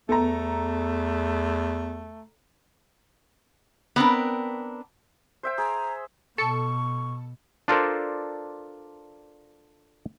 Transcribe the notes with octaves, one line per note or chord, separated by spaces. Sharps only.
E2 A3 B3 A4 A#5
B3 C4 D4 A#4
C5 E5 G5
G#4 A#5
B2 A4 C#6 C#7
D4 F4 A4 A#4 C5 D5